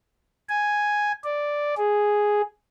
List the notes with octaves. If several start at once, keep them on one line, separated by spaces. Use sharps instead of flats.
G#5
D5
G#4